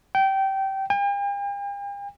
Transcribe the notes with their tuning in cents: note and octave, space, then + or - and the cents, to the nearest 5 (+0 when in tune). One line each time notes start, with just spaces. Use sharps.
G5 -20
G5 +45